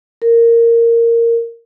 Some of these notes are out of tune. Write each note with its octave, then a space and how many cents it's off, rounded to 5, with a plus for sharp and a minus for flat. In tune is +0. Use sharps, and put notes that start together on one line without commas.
A#4 -10